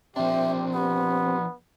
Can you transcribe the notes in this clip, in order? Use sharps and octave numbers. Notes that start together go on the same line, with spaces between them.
F3 C4 D4 G4 E5
B3 G4